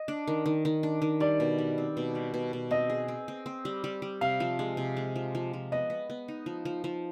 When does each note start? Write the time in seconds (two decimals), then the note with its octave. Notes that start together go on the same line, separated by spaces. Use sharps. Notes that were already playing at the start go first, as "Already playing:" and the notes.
Already playing: D#5
0.08 D4
0.28 D#3
0.46 D#3
0.65 D#3
0.83 D4
1.02 D#3
1.20 G3 D5
1.40 B2
1.58 G3
1.78 C4
1.97 B2
2.15 G3
2.34 B2
2.53 B2
2.71 C4 D#5
2.90 G#4
3.08 C4
3.28 C4
3.46 C4
3.65 G3
3.84 G3
4.02 G3
4.21 C3 F5
4.40 F3
4.59 G#3
4.77 C3
4.97 G#3
5.16 F3
5.35 F3
5.53 F3
5.72 B3 D#5
5.90 B3
6.10 B3
6.28 D#4
6.46 F3
6.65 F3
6.84 F3